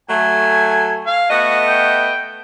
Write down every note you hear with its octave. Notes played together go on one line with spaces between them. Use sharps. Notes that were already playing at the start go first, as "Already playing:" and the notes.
F#3 A3 G#5
F5
A3 B3 F#4 D#5
G5